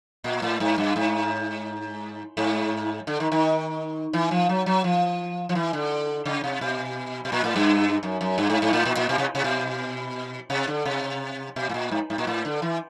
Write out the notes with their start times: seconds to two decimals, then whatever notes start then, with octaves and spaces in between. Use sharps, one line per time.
0.24 A#2
0.42 A2
0.60 G#2
0.78 G2
0.96 G#2
2.37 G#2
3.07 D3
3.20 D#3
3.32 D#3
4.13 E3
4.31 F3
4.49 F#3
4.66 F#3
4.84 F3
5.49 F3
5.55 E3
5.73 D3
6.25 C#3
6.44 C3
6.61 B2
7.25 B2
7.32 A#2
7.44 A2
7.56 G2
8.03 F#2
8.21 F#2
8.38 G2
8.50 G#2
8.62 G#2
8.73 A2
8.85 A#2
8.97 A#2
9.09 B2
9.18 C3
9.35 C3
9.44 B2
10.50 C3
10.67 D3
10.85 C3
11.56 B2
11.69 A2
11.74 A#2
11.91 G#2
12.10 G#2
12.18 A#2
12.27 A2
12.45 D3
12.62 E3